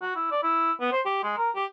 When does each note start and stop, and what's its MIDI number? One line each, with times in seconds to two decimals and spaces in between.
0.01 0.14 66
0.16 0.30 64
0.31 0.43 74
0.43 0.72 64
0.80 0.92 59
0.92 1.00 72
1.05 1.23 67
1.23 1.35 56
1.38 1.51 70
1.56 1.65 67